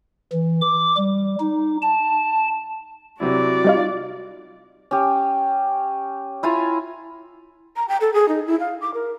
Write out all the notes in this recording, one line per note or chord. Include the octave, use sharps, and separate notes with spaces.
E3
D6
G3
D#4
A5
C3 F#3 E4 F#4 D5
G3 D#4 F4
C#4 G4
E4 F4 G#5 A#5
A#5
G5
A4
G#4
D#4
E4
F5
D6
A#4